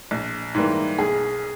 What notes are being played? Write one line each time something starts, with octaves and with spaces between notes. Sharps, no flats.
A#1
G#2 E3 G3 A#3
B1 G#4